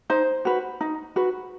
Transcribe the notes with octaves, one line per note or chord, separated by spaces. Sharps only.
D#4 C5
F#4 B4
D#4
F#4 B4